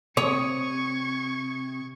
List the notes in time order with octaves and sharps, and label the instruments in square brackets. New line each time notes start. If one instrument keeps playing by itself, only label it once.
[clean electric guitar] C3 [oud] C#5 [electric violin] C#6 G#6 [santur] D#6